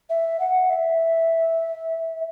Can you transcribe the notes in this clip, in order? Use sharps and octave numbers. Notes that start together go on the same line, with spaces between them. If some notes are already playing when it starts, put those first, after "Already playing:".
E5
F#5
E5